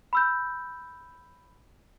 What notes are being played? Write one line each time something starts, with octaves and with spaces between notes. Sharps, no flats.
B5 E6 G6